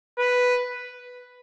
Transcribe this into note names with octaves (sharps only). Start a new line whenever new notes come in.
B4